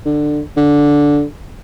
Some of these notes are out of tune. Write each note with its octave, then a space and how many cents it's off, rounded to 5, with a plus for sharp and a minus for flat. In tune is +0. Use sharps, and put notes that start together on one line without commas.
D3 +15
D3 -10